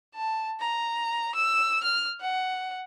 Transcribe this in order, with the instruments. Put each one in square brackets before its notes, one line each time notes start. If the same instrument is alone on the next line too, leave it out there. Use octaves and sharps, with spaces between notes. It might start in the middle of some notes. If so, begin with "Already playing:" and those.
[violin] A5
A#5
E6
F6
F#5